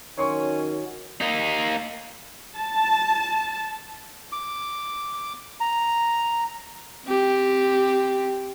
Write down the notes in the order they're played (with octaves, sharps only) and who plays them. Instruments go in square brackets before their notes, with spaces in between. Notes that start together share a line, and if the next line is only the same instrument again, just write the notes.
[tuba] D#3 [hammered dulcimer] F#3 [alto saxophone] C#4 [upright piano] C#5 C6 C#6
[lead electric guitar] A#3 D#4
[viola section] A5
[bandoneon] D6
A#5
[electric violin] C4 G4